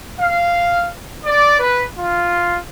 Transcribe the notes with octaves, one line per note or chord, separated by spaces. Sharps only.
F5
D5
B4
F4